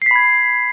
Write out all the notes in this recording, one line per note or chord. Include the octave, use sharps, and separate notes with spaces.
B5 G#6 B6 C7